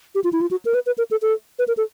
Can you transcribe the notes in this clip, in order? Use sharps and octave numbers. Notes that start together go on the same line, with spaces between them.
G4
F4
E4
F4
F#4
A#4
B4
B4
A#4
A4
A4
B4
A#4
A4